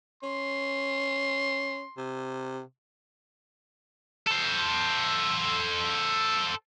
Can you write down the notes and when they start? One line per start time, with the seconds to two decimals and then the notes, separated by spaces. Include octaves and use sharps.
0.23 C#4 C6
1.97 C3
4.27 A4 C5